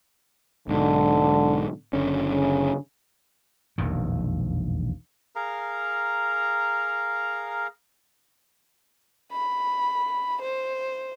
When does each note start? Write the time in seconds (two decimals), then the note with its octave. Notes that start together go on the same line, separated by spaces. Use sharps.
0.68 B1 G#2 D3
1.93 F#1 D3 C#4
2.33 C#3
3.78 E1 A#1 F2 D#3
5.36 G#4 A#4 F5 A#5
9.32 B5
10.42 C5